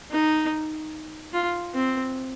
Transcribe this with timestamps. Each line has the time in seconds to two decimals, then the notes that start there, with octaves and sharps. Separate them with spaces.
0.11 D#4
1.33 F4
1.74 C4